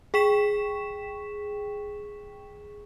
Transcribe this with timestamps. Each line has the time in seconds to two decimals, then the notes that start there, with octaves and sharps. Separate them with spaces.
0.14 G#4 G5 C#6 B6 E7